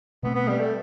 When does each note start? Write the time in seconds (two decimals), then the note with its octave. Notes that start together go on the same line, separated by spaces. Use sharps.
0.23 B2 A3 B3 C4
0.35 B3
0.48 G3
0.60 A3